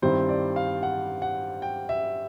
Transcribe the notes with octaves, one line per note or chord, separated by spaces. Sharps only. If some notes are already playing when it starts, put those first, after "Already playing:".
G2 D#3 G3 C4 E4 C5
D5
F5
F#5
F#5
G5
E5